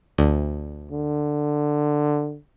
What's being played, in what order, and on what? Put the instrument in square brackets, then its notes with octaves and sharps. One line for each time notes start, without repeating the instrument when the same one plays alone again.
[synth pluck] D2
[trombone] D3